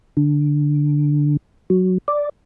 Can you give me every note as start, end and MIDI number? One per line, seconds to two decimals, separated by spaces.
0.17 1.37 50
1.70 1.98 54
2.08 2.29 74